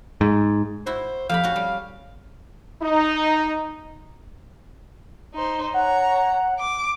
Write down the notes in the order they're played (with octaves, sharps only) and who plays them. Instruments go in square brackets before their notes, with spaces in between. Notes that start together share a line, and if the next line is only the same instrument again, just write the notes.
[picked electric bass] G#2
[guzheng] E4 F#4 [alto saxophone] C5
[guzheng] F2 G4 B5 [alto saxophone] F5
[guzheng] C#4 F#4
G3
[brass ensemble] D#4
[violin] D#4 C5
[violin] C#5 A#5 [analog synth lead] F#5
[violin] D6